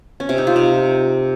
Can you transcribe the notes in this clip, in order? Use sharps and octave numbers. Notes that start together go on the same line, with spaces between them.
C#4
C3
D#4
F4
C3